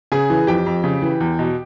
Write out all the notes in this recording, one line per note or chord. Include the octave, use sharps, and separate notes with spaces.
C#3 G#4 G#5
E3
F2 G4 G5
F2
C#3
E3
E2
B2